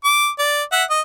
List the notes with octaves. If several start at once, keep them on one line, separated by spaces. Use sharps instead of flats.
D6
D5
E5 F#5
D#5